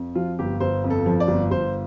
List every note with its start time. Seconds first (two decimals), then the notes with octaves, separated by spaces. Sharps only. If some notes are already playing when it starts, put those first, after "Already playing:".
Already playing: F2
0.15 F3 F4
0.39 G1 G4
0.60 G1 C5
0.84 F2
0.90 A4
1.06 F3
1.20 D5
1.28 G1
1.51 G1 C5